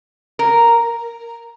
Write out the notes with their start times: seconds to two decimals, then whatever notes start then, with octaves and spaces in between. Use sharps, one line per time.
0.39 A#4